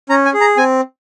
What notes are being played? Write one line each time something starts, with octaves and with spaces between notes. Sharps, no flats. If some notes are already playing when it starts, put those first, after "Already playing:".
C#4 A#5
G#5
G#4
A#5
C4 G#5